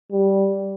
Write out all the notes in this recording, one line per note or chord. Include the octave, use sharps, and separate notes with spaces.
G3